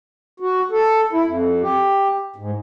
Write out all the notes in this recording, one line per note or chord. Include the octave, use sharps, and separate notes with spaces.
F#4
A4
E4
F2
G4
G#2